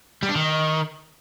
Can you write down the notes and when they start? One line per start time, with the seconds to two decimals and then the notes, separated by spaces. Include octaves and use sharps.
0.23 G3
0.29 D4
0.35 D#3